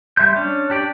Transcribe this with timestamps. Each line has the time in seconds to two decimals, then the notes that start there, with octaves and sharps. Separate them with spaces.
0.17 G3 E5 C6 G6
0.36 C#4 D4
0.70 D4 G4 D5